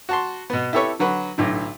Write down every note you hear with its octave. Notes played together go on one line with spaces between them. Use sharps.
F#4 A5 C6
B2 B3
E4 G4 A4 B4 C#5 E5
D3 F#3 F#4 B4
B1 A2 D3